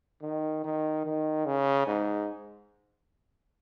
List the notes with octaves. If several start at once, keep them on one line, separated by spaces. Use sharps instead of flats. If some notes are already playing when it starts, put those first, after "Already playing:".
D#3
D#3
D#3
C#3
G#2